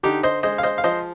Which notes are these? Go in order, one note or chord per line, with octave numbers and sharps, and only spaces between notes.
D3 D#4 G4
C5 D#5
G#3 C5 D#5
F5
C5 D#5
F5
F3 C5 D#5